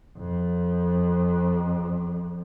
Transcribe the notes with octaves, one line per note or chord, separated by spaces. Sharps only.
F2